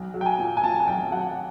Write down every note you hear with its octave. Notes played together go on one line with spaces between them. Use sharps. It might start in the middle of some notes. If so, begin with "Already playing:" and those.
Already playing: B1
F#3
G5
G#5
A#2
G#5
A#2 A5
G#5
B1 G5
F#3 F#5